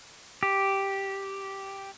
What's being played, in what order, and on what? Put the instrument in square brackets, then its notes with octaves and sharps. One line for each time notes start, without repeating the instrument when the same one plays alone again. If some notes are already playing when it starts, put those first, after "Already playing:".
[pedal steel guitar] G4